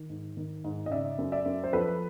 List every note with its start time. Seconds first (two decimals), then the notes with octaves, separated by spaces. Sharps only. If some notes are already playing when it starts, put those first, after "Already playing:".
Already playing: D#3
0.10 G#2
0.37 D#3
0.64 G#2
0.86 D#5
0.91 C#3 D5 E5
1.19 F#2
1.32 D5 E5
1.46 F#2
1.64 C5
1.73 F3 A4 B4